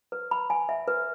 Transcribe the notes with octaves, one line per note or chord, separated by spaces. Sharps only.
B4
B5
G#5
E5
B4